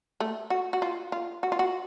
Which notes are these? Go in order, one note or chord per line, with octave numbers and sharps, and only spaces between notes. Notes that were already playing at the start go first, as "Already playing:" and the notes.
A3
F#4
F#4
F4
F4
F#4
F4
F#4